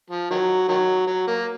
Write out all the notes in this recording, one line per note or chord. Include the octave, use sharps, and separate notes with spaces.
F3
D#3 F#3
D#3 F#3
F#3
A#3